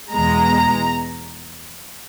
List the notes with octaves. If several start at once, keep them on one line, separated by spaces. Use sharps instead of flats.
E2 B2 G#3 A#5